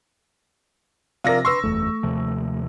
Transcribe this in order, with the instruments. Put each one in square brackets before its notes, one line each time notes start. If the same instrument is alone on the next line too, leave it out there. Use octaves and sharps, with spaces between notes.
[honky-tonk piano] C3 F3 A#6 [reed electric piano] A#4 D5 F5
[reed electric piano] B4 C6 [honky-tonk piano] C#6 E6
[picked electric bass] F#1 E2 [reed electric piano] A3
[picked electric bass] D#2 C3 F3